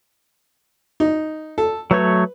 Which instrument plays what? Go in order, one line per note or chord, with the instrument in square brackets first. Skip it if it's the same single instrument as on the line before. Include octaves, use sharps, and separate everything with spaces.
[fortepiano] D#4
A4
[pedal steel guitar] F#3 A3 C#5 [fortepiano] B4